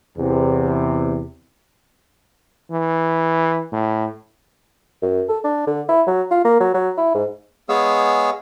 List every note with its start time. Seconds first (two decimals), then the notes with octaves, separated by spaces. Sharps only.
0.17 E2 C3
2.71 E3
3.73 A2
5.03 F#2
5.29 A4
5.44 D4
5.67 D3
5.89 E4
6.07 F#3
6.31 F4
6.44 A#3
6.60 F#3
6.75 F#3
6.97 E4
7.15 G#2
7.69 G#3 B3 G#4 C#5 F5 E6